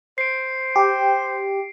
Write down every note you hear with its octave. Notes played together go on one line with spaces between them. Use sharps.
C5 C7 D7
G4